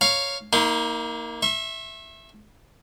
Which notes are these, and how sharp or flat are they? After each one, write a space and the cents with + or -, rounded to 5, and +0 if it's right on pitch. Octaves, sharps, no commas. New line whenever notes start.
C#5 +0 F5 +0 A#5 +15
A#3 +0 D#4 +35 C6 -30
E5 +0 C#6 -45